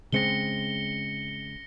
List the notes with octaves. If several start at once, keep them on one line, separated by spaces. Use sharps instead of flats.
C#3 G#3 C4 A#6 C#7 G7